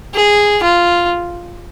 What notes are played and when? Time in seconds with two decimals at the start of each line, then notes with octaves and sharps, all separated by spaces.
0.15 G#4
0.63 F4